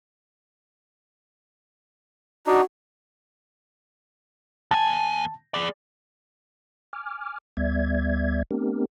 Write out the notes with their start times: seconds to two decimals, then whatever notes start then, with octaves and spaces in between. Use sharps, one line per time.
2.47 D4 D#4 F#4
4.71 D#2 G#5 A5
5.54 G#4 D5
6.93 G#5 D6 F6
7.57 D2 G3 B3 D5 E5 G#6
8.51 A3 B3 C4 D4 G4 A#4